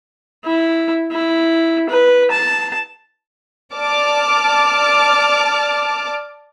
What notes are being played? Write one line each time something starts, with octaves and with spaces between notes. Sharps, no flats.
E4
E4
B4
A5
D5 A5 D6 F6